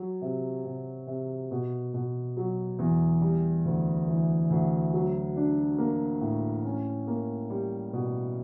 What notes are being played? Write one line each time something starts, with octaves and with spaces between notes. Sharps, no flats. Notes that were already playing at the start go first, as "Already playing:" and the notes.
Already playing: F#3
C3
C3
C3
B2
B2
F#3
E2
G3
D2
E3
D2
F#3
D4
A#3
A2
C#4
A#3
G3
B2